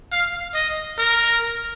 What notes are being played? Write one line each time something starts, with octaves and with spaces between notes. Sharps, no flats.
F5
D#5
A#4